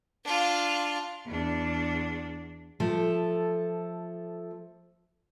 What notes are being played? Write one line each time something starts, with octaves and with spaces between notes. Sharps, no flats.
D4 F4
E2 D4
F3 A3 A4